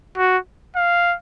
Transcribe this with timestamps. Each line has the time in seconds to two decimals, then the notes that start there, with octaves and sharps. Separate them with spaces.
0.18 F#4
0.76 F5